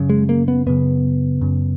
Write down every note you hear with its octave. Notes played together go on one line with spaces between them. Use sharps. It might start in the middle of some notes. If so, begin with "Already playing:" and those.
Already playing: F#2 C#3
G#3
A#3
B3
F#2 C#3 B3
F#2 C#3